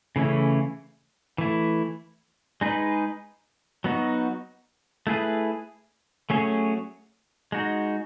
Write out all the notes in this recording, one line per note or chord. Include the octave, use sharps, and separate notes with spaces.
C#3 E3 A3 C#4 E4
E3 A3 E4
G#3 D#4 G#4 B4
F#3 B3 D#4 F#4
A3 E4 G#4 B4
F#3 A3 C#4 G#4 C#5
G#3 D#4 F#4